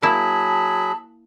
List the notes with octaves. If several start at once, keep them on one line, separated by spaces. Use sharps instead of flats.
F#3 A#3 E4 G#4 E5 A5 B5